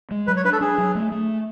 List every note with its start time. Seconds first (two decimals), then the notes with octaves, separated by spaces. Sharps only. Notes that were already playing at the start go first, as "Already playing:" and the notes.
0.11 G#3
0.27 F#3 B4
0.36 C#5
0.44 D4 B4
0.53 A4
0.61 D4 G#4
0.78 F#3
0.95 A3
1.12 A3